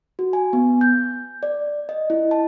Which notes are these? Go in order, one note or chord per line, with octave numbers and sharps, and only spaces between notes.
F#4
G#5
B3
G6
D5
D#5
E4
A5